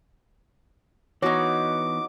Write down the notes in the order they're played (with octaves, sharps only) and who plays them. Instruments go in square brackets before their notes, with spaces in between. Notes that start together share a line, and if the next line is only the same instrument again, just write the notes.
[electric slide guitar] E3 B3 [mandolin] D#4 F#4 [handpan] C#5 [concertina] D6